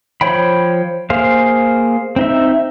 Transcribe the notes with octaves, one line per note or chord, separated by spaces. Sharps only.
F3 C5 C#5 G5 B5
A#3 G#4 C5 F5
C4 D#4 E5